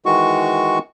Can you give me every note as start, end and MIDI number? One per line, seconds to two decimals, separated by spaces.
0.06 0.79 51
0.06 0.79 52
0.06 0.79 56
0.06 0.79 66
0.06 0.79 85